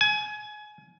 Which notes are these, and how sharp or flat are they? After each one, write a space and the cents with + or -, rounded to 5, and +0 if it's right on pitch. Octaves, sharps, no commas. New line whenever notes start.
G#5 +25